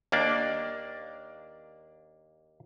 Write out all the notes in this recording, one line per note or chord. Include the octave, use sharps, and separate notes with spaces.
D#2 A#3 D4 D5